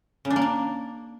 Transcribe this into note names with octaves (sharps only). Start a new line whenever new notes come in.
C#3
D4
A#3
D4